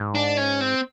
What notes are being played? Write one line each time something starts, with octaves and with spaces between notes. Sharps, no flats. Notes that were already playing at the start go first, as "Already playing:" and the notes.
Already playing: G#2
D4
C#4
C4